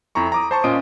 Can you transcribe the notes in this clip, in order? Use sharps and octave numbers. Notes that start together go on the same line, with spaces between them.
F2 E4 A#5 C#6
A#5 D6 D#6
C5 A5 C#6
A#2 C#4 F4 D#5 D#6 D7